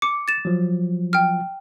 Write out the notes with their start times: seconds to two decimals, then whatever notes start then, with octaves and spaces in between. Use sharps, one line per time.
0.02 D6 C#7
0.28 A6 E7
0.45 F3 F#3
1.13 G5 F6